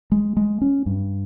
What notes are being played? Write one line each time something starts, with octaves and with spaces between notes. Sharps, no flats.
G#3
G#3
C#4
G2